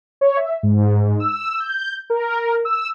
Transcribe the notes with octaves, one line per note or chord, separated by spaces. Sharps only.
C#5
E5
G#2
E6
G6
A#4
E6